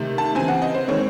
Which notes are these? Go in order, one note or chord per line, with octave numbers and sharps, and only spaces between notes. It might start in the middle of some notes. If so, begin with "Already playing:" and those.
Already playing: C3 D#3 A3
A5
C#3 E3 C4 G#5
F#5
D#5
C5
D#3 G#3 C4 C#5